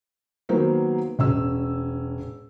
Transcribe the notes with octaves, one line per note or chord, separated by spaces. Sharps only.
D#3 F#3 A#3 B3 A#4 C5
E1 C#4 E6